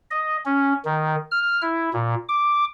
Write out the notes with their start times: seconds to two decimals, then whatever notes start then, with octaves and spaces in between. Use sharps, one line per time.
0.11 D#5
0.46 C#4
0.85 D#3
1.31 F6
1.62 E4
1.93 A#2
2.29 D6